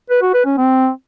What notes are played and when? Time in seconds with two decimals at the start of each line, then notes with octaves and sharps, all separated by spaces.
0.10 B4
0.22 F#4
0.34 B4
0.46 C#4
0.58 C4